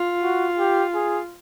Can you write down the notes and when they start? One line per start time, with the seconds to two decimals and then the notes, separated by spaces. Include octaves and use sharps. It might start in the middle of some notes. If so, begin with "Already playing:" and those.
Already playing: F4
0.23 F#4
0.59 G4
0.95 G#4